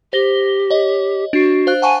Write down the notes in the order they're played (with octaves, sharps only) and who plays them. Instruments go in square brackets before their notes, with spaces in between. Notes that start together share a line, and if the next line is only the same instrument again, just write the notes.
[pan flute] G4 [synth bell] C5 A#6 G7
[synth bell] C#5 D#5
[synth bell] D4 C7 [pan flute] F#4
[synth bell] C5 F5 F#6
[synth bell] F#5 A5 C#6 [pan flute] G#5